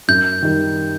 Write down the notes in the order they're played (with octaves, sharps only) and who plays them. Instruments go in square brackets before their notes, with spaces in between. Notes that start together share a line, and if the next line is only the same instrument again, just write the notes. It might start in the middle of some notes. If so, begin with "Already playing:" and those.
[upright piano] F#2 [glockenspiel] G6
[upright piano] D#3 G3